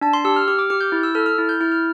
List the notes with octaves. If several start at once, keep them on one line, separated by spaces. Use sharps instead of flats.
D4 A5
C6
G4 E6
F6
G4 F6
D6
G4 F6
G6
E4
E6
A4 F6
F6
E4
G6
E4 F6
F6